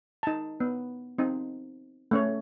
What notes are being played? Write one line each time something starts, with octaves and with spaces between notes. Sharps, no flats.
D#4 A5
B3
C4 D#4
A3 C#4 C#5